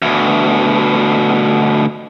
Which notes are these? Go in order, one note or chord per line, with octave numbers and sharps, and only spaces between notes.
D2 B2